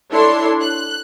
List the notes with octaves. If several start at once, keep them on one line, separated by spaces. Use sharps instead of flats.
D4 E4 A4 C#5 C6
F#6